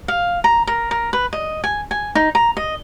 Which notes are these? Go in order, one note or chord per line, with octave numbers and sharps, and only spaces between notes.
F5
A#5
A#4
A#4
B4
D#5
G#5
G#5
D#4
A#5
D#5